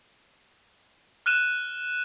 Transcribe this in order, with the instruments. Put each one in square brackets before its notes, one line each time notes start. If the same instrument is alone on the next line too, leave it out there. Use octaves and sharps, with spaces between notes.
[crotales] F6 F#6 D#7 E7